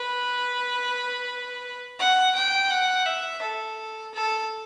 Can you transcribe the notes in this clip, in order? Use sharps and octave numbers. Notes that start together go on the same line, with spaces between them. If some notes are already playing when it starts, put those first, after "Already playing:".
Already playing: B4
F#5
G5
F#5
E5
A4
A4